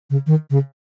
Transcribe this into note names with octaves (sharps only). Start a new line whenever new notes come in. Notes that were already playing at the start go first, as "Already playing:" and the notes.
C#3
D#3
C#3